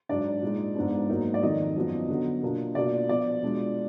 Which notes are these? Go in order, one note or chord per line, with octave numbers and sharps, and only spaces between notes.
G#2 F#3 D4 D5
A#2 G#3 D#4
G#2 F3 B3 D4
G#2 F#3 A#3 D#4
D5
F2 D#3 F#3 D#5
F#2 F3 B3
D3 F#3 B3
B2 A#3 D4 F4
B2 A#3 D4 F4 D5
A#2 F3 B3 D5
B2 G#3 D4 F4